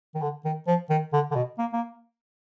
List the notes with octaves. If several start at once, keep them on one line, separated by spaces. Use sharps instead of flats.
D#3
D3
D#3
F3
D#3
D3
D3
B2
A#3
A#3